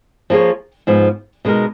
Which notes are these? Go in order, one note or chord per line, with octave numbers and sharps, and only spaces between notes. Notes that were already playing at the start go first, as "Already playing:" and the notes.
F3 A#3 F4 G#4 C#5
G#2 F3 B3
B2 G#3 D#4 A#4